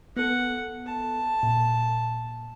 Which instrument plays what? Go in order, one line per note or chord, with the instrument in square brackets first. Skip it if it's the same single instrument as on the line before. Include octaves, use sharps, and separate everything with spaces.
[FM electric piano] B3 A4 [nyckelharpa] F#5
[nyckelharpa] A5
[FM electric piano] A#2